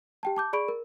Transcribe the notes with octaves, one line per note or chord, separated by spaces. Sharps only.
G4 G5 A5
A5 D6 G6
G#4 D5 B5 C#6 D7
A#4